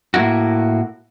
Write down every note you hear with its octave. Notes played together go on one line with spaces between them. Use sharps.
A2 A#3 B3 E4 F#4